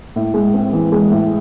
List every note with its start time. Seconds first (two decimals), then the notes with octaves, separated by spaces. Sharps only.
0.16 A2
0.34 G#3
0.54 C4
0.73 E3
0.92 G#3
1.11 A2